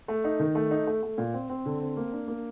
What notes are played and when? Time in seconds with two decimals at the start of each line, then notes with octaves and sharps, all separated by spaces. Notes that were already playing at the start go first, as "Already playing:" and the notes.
0.08 A3
0.24 D#4
0.40 D#3
0.55 A3
0.71 D#4
0.87 A3
1.03 A3
1.18 A#2
1.34 C4
1.49 C4
1.66 D3
1.81 C4
1.97 A#3
2.12 D4
2.28 A#3